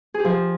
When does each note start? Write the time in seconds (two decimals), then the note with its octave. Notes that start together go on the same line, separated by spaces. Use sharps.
0.14 G#4
0.20 G4
0.25 F3